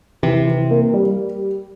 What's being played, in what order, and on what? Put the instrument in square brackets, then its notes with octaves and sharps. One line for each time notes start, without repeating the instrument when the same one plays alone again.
[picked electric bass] C3 [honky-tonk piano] E3
[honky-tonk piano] E3
A#3
G3